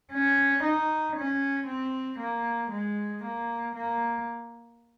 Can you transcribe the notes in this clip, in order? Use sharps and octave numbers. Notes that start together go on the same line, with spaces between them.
C#4
D#4
C#4
C4
A#3
G#3
A#3
A#3